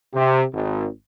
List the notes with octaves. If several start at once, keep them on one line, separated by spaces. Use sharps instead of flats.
C3
G#1